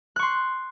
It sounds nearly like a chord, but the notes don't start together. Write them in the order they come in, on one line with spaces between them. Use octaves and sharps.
F#6 C#6 C6